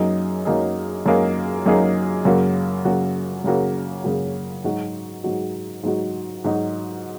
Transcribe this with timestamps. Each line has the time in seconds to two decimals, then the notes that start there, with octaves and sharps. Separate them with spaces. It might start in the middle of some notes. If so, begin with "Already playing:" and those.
Already playing: F#2 F#3 A#3 D#4 G#4
0.45 F#2 F#3 A#3 D#4 G#4
1.06 F#2 F#3 A#3 D#4 G#4
1.66 F#2 F#3 A#3 D#4 G#4
2.25 F#2 C#3 A#3 F#4
2.85 F#2 C#3 A#3 F#4
3.44 F#2 C#3 A#3 F#4
4.04 F#2 C#3 A#3 F#4
4.64 G#2 F#3 D#4 F#4
5.24 G#2 F#3 D#4 F#4
5.83 G#2 F#3 D#4 F#4
6.44 G#2 F#3 D#4 F#4